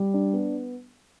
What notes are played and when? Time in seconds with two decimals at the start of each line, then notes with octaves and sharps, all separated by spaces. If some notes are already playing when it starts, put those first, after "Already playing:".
Already playing: G3
0.14 D4
0.33 B3